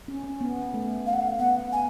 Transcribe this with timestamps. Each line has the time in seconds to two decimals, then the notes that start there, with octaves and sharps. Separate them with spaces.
0.08 C#4
0.24 C#4
0.41 B3
0.74 A3
1.06 F5
1.13 F#5
1.21 F5
1.39 B3 F#5
1.73 G#5